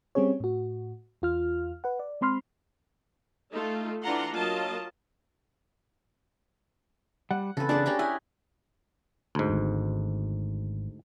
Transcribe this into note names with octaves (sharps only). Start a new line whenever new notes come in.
G3 C4 C#4 G#4 C#5
A2 F#4
E2 F4 F6
B4 F#5
D5
G#3 C4 B5 C6 F6
A3 D#4 F4 A4
E3 D4 F4 F#5 A#5 C6
F#3 A#3 F4 A#4 D#5 A5
G3 F#5
C#3 E3 C4 A4 B4
D4 G#4 D5 F#5 A5
C#4 G4 A#5
E4 G4 D#5 F#5 G#5
D2 G#2
G#1